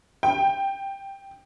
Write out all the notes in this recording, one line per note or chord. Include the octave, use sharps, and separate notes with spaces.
G5